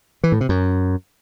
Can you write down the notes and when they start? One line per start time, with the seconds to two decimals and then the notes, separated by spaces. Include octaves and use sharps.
0.24 E3
0.32 A2
0.41 C3
0.49 F#2